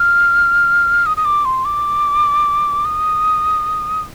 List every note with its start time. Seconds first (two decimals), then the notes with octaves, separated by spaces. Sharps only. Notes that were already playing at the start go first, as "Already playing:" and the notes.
Already playing: F6
1.06 D#6
1.17 D#6
1.25 D6
1.45 C6
1.65 D6
2.85 D#6